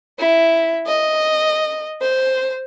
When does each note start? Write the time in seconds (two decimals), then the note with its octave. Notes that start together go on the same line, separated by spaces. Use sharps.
0.19 E4
0.87 D#5
2.01 C5